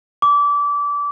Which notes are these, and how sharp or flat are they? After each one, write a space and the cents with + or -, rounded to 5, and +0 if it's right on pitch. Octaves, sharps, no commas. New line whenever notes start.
D6 -25